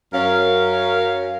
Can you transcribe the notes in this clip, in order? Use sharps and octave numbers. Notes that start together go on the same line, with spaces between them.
F#2 C#4 A#4 C#5 F5